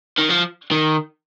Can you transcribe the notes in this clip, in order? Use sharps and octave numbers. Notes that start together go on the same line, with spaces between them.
D#3
F3
D#3